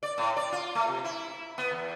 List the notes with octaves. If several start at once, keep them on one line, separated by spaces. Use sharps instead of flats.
D5
A2
D5
F4
A3
C3
E4
B3
E2